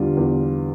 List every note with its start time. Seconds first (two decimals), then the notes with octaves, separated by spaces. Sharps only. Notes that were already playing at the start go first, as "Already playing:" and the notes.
Already playing: E2 D3 G3 F4
0.17 E2